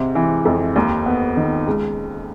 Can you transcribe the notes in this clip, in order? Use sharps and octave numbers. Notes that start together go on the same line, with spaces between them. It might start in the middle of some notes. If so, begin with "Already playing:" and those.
Already playing: G#2 C3
E3
F2
D#2
B3
D#3
C#2